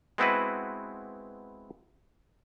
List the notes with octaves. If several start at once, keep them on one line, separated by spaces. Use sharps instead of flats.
G#3 B3 C4 E4 F#4 B4